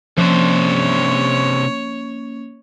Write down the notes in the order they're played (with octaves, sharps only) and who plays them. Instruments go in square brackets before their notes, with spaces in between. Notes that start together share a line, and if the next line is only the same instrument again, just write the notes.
[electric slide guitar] C3 D4 C5 [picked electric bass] F3 [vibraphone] A#3 C#4 [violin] C#5